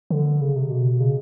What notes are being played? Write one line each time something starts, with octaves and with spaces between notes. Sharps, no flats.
D3
C#3
C3
B2
C#3